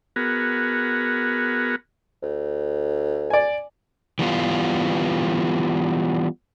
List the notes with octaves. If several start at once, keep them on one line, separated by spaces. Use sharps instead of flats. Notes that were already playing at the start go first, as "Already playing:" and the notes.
B3 F#4 G#4 A#4
D2
D5 G#5
E3 G3 B3 F4